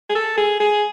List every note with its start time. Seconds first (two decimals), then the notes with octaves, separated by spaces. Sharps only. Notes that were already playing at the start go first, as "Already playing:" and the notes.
0.10 G#4
0.15 A4
0.38 G#4
0.60 G#4